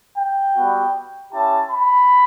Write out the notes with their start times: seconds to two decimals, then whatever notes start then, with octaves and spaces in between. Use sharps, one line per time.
0.17 G5
0.57 G3 B3 F#4
1.33 C#4 E4 G4 A5
1.70 B5